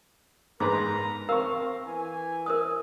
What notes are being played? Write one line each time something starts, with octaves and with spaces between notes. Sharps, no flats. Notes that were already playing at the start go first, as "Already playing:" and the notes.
G#2 A#4 B4 A#5 C6 D6
C4 A#4 F5 C#6
E3 G#5
A#4 C5 D#6